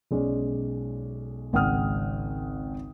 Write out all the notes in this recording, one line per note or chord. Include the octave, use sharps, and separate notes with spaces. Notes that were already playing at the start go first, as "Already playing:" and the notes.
B1 G#3 C#4 D5
G#1 C#2 F#5 G5 D#6 F6